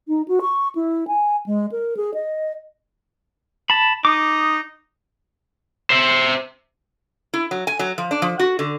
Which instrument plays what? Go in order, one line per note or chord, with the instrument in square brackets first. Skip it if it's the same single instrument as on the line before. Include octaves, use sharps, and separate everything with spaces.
[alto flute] D#4
F#4
C#6
E4
G#5
G#3
A#4
G#4
D#5
[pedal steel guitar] A5 B5
[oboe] D#4 [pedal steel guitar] D6 D#6
[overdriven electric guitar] C5 E5
[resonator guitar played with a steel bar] E4
F#3
G#5
F#3
F3
D4
F3
F#4
D3